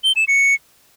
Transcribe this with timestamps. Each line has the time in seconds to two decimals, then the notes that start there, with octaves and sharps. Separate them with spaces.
0.04 G7
0.16 E7
0.28 C#7